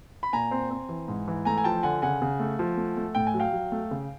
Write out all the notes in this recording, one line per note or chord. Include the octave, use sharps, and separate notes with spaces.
B5
A#2 G#5 A#5
C4
C4
E3
G#2
E3
A3 G#5 A#5
G#5
F3 G5 A5
D3 F#5 G#5
C#3 F#5 G#5
C#3
A3
F3
A3
A3
A2 G5
G#5
F#3
F5 G5
F#3
A3
C#3